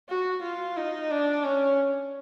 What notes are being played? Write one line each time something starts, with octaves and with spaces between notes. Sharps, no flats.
F#4
F4
D#4
D4
C#4